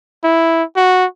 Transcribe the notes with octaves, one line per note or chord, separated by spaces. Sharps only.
E4
F#4